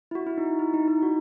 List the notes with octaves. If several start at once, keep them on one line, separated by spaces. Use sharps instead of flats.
E4
F#4
E4
D#4
E4
D#4
D#4
F#4